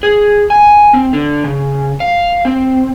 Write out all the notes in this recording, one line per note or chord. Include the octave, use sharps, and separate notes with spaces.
G#4
G#5
C4
D3
C#3
F5
C4